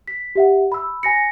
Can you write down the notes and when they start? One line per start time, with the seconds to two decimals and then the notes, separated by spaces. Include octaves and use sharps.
0.08 B6
0.35 G4 E5 F#5
0.72 B5 E6
1.03 G#5 A#6 C#7